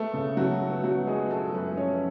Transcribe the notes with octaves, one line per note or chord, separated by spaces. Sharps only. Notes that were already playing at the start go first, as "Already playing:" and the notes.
Already playing: A3 B3 A4
C#3
C#3 F#3 F#4
B3
F#3 B3 F#4
G#3 B3 G#4
A3 B3 A4
F#2 B3 B4
F3 C#4 C#5